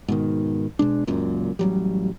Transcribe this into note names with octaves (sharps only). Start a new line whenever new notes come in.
G#2 B2 D#3
B2 G#3 D4
F#1 C#2 F#2 A#2
A1 F#3 G3